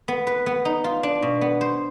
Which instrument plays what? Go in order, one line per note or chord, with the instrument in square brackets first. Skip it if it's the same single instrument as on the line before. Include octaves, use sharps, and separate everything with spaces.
[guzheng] B3
B4
B3
D#4
F4
D4
B2
B3
C5